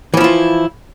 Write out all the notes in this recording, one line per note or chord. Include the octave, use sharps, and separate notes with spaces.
E3 F3 E4 F4